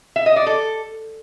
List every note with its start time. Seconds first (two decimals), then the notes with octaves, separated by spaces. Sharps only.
0.16 E5
0.26 D#5
0.36 D5
0.46 A4